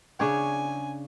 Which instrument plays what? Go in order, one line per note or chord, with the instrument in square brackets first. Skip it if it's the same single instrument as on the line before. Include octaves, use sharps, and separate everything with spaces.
[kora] C#3 D4 C#5 [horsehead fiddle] G#5